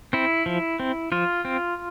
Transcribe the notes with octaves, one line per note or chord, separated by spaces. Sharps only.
C4 E4
F3
C4
F3 F4
C4